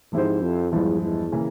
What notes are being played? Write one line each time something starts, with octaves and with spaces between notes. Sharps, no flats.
G#2 F3 C4 E4 G4 C5
F2
E2 G2 F3 G#3 E4
E2
C#3 E3 A#3